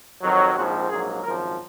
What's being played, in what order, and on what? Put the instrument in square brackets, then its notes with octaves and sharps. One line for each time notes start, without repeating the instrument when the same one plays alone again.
[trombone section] F2 D#3 F#3
A#1 G#2 F3 C4 F#4
A#1 G#2 F#3 A#3 G#4
G#1 F#2 F3 A#4